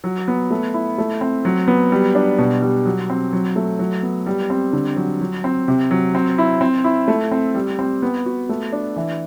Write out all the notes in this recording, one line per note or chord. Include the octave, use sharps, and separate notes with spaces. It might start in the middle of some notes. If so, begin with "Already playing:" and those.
F#3
B3
A3
E4
A3
C4
F#3
B3
G3
D4
B2
G3
F#3
C4
F#3
A3
F#3
B3
G3
C4
D3
F#3
F#3
C4
C3
F#3
C4
E4
C4
E4
A3
C4
G3
C4
B3
F#4
A3
D4
E3